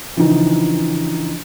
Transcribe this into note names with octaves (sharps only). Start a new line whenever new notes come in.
C#3 E3 F3 D4 D#4